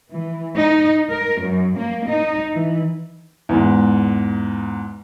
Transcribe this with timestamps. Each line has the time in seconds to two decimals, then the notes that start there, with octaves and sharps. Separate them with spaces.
0.11 E3
0.57 D#4
1.10 A#4
1.41 F#2
1.78 A#3
2.08 D#4
2.52 E3
3.49 E2 G#2